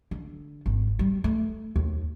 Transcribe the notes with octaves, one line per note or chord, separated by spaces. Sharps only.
D3
G#1
G3
A3
D#2